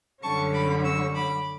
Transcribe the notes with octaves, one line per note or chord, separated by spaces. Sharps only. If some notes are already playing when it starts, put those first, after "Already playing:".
F#2 D3 G3 C#4 A5 C#6
B5 D6
C#6 E6
B5 D6